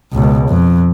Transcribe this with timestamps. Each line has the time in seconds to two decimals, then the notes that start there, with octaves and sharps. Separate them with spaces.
0.12 C#2 B2
0.49 F2